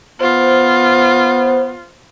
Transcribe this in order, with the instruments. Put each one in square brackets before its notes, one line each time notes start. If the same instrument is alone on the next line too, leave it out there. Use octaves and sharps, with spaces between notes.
[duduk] B3 [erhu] F4 [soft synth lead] C5